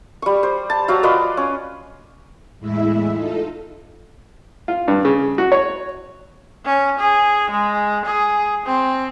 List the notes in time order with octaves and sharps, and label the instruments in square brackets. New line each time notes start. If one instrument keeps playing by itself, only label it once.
[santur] G3 C#6
C5
A5
F#3 F5 A#5
F4 B4 D5 D#5
C#4
[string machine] E2 A2 G#3 E4 E5
D#4 F4 A4
[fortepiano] F4
G2
C#3
F#4
C#5
[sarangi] C#4
G#4
G#3
G#4
C4